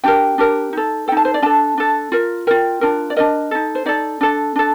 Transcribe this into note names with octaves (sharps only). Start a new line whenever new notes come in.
D4 G4 A#4 G5
D4 G4 A#4
D#4 A4
D#4 A4 G5 A5
C5
D5
D4 A4 A5
D4 A4
F4 A#4
F4 A#4 G5
D4 F4 A#4
D5
D4 F4 A#4 D#5
D#4 A4
C5
D#4 A4 D5
D4 A4
D4 A4